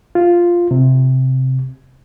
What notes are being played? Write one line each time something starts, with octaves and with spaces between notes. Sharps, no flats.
F4
C3